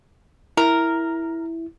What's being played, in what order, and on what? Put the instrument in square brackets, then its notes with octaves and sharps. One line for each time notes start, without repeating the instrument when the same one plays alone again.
[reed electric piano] E4 [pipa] A#4